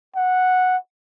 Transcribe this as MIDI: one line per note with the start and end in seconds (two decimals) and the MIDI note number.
0.16 0.77 78